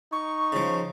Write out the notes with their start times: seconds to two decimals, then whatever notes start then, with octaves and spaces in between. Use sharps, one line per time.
0.12 D#4 C#6
0.52 C#3 F3